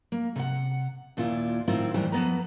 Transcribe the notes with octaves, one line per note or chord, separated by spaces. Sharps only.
A#3
C3 F#5
D#2 A#2 E4 F4
A2 D#3 C4 E4 F4
D#2 A2 E3 G3 C5 G5
F2 C#3 B3 B4 A#5